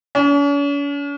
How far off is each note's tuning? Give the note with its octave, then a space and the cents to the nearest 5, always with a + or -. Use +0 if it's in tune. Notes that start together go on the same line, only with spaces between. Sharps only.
C#4 +45